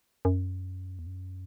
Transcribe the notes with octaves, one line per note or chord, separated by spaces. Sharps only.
F#2
E2
F#2